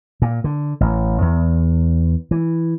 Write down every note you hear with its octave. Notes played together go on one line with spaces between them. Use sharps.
A#2
D3
A1
E2
E3